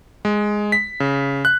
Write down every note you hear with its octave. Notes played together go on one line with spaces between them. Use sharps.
G#3
B6
C#3
F#6